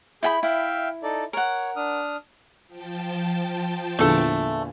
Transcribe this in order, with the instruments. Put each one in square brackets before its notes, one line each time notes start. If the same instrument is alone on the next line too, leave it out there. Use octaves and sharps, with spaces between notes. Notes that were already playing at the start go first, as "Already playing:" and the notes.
[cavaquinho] E4 G5 B5 [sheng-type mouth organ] G#4 G6
[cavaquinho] E4 [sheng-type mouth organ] E5 F5 G5
[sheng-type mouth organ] D#4 A4 D5
[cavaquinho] A#4 F#5 [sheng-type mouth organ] C#5
[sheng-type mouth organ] D4 D#6 F6
[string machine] F3 G5 A5
[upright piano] E2 A#2 D3 [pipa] A3 A4